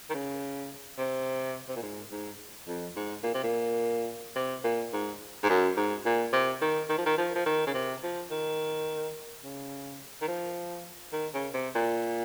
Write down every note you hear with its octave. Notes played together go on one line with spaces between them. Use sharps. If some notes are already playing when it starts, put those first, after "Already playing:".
D#3
C#3
C3
C3
A#2
G#2
G#2
F2
G#2
A#2
C3
A#2
C3
A#2
G#2
G#2
F#2
G#2
A#2
C3
D#3
D#3
F3
D#3
F3
F3
D#3
C#3
C3
F3
D#3
C#3
D#3
F3
D#3
C#3
C3
A#2